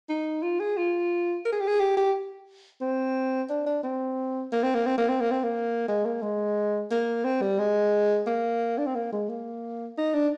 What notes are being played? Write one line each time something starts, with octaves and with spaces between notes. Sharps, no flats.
D#4
F4
G#4
F4
A#4
G#4
G4
G#4
G4
G4
C4
D4
D4
C4
A#3
C4
A#3
C4
A#3
C4
A#3
C4
A#3
G#3
A#3
G#3
A#3
C4
G3
G#3
A#3
D4
C4
A#3
G#3
A#3
D#4
D4